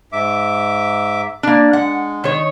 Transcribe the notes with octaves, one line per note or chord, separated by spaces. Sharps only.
G#2 E5 D6
A#3 D4
G#3 F#5
D#3 C#5